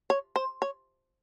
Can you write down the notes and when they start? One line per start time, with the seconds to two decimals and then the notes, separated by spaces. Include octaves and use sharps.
0.10 C#5
0.36 C5
0.62 C#5